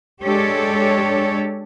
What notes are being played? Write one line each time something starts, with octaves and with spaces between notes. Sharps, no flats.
G#3 D4 G4 A4 C#5